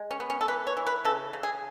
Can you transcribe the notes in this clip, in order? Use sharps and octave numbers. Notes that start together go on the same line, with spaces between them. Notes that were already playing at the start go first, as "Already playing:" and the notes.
Already playing: G#3
C#4
B3
C#4
A4
E3 B4
C#5
E3
B4
C#3 A4
C#3
G#4